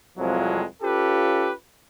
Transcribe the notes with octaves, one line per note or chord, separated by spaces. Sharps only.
C2 F2 F3 F#3 G#3
C#4 F4 G4 A4 B4